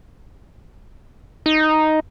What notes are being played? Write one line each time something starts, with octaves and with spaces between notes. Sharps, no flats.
D#4